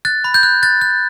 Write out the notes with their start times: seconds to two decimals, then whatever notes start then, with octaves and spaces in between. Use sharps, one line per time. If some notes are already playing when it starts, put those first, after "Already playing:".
0.05 F#6 A6
0.24 B5
0.34 G6
0.43 F#6
0.63 F#6 A6
0.81 F#6